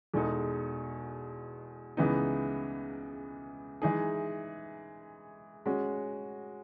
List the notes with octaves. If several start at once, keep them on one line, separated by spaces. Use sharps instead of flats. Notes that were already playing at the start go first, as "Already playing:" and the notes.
E2 B2 G#3 D#4 A4
C#2 C#3 E3 B3 D#4
E3 G#3 D#4 G#4
G#3 C#4 F#4